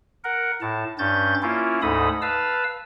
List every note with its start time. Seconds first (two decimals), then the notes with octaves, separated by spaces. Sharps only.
0.24 A#4 F#5
0.62 A2 A5
0.99 G2 C#4 G6 A6
1.42 A#3 C#4 E4 F4
1.82 D2 G#2 D#4 A4 B5 D#6
2.22 B4 F5 A5 E6